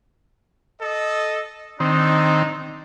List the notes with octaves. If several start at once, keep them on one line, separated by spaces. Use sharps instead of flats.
A4 D#5
D#3 C4 D4 D#4